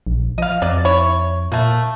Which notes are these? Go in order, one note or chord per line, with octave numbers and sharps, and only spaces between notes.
A#1
F3 D#5 F5
F2 F#3 D5
E4 C#5
A#2 A3 A#3